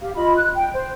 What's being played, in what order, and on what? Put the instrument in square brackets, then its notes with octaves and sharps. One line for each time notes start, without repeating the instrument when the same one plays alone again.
[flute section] G4 F5
F4 D#5 B5
F#6
G5
C5